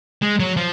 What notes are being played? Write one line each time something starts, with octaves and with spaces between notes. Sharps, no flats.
G#3
F#3
F3